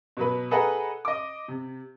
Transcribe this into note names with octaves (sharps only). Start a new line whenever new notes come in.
B2 F#3 B4
G#4 A4 B4 D#5 F#5 A#5
D#5 D6
C3